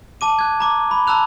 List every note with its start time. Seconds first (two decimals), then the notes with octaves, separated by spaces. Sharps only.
0.21 A5 D6 D#7
0.39 F#6 G#6
0.60 A#5 D6
0.91 B5
1.07 A5 A#5 E6 F#6 F7